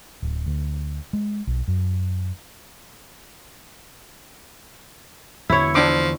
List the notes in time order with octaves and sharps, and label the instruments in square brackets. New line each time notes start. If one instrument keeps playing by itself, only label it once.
[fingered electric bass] D1
D2
G#3
B1
F#2
[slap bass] E2 D3 E3 [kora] E4 C#5
[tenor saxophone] F3 [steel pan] D4 D6